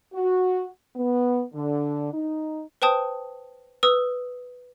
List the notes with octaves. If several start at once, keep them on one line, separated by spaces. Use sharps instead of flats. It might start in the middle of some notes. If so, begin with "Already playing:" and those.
F#4
B3
D3
D#4
B4 C5 G5 A5 D#6
B4 D#6 E6